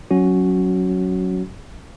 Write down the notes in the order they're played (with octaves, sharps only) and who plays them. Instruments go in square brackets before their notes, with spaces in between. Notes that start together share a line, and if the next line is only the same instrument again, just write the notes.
[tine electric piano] F#3 C#4 F#4